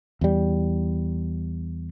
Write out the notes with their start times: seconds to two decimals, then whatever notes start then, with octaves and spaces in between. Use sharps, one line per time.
0.21 E2 G3